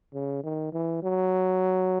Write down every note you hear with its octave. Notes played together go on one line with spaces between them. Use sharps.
C#3
D#3
E3
F#3